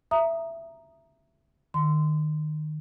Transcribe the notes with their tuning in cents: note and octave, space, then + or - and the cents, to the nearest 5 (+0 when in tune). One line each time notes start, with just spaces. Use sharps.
E5 +10 A#5 +0 D#6 +0
D#3 -25 C6 -20